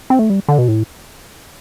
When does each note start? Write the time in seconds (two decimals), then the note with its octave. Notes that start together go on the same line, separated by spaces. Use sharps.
0.10 C4
0.19 A3
0.30 G3
0.48 D3
0.58 B2
0.68 A2